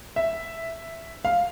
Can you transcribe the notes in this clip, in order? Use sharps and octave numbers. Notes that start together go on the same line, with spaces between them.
E5
F5